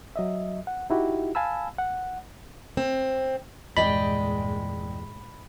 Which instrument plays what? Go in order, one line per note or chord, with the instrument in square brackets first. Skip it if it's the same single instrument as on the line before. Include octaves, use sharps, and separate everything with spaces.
[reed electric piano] F#3 D#5 E5
F#5
D#4 E4 F#4 G4
F5 G#5 A5 B5 E6
F#5
[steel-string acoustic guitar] C4
[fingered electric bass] E2 [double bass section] G2 A#2 G#3 [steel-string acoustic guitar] D5 D#5 G5 [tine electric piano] B5